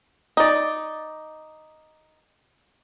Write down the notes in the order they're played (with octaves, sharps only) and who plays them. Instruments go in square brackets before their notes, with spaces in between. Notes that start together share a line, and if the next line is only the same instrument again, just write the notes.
[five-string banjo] D#4 D5